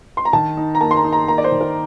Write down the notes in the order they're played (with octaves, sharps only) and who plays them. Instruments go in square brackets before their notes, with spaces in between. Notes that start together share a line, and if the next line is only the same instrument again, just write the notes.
[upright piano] C6
A#5
[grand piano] D#3 [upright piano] A5
[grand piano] D#4
[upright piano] A#5
[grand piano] A#3 [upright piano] A5
[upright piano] C6
A#5
[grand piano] D#4
[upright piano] A#5
[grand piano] A#3 [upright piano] A#5
[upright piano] D5
C5
[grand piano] D#3
[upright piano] A#4